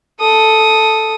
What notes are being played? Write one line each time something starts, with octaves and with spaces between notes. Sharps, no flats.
A4 D#6